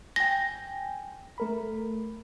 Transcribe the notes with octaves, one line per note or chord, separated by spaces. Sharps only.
G5 G#5 A#6
A3 A#4 B5